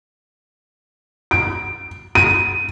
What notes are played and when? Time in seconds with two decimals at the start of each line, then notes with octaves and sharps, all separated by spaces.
1.31 D7
2.15 D#7